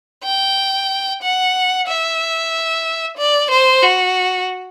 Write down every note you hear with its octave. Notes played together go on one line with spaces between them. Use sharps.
G5
F#5
E5
D5
C5
F#4